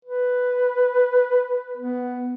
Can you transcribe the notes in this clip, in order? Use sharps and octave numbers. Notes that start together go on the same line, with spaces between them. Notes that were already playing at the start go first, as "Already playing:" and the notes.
B4
B3